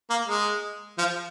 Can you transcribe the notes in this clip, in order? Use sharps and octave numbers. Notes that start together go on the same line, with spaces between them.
A#3
G#3
F3